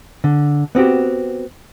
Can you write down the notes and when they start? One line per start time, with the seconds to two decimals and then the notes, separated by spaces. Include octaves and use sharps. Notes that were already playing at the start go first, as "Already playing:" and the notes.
0.24 D3
0.75 B3 C4 F#4 G4